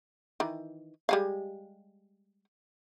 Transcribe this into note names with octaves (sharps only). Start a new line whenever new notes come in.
D#3 E3
G3 G#3 F5